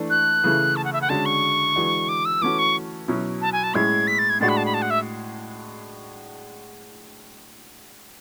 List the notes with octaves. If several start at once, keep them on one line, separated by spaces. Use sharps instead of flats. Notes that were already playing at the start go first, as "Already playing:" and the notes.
Already playing: E3 A3 D4
F#6
C#3 E3 A3 E4
A5
F#5
E5
F#5
D3 G#3 C#4 F#4 A5
C#6
E3 G#3 D4 F#4
D6
E6
E3 A3 C#4 F#4 D6
C#6
B2 F#3 C#4 E4
A5
G#5
A5
A2 G#3 C#4 E4 G#6
B6
A6
G#6
A2 G#3 D4 F#4 A6
B5
A5
B5
A5
F#5
E5